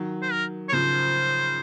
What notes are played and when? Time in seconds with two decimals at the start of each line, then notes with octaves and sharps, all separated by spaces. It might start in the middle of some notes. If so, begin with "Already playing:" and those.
Already playing: D#3 F#3
0.22 C5
0.32 A#4
0.69 C#5
0.72 C#3 F3 C5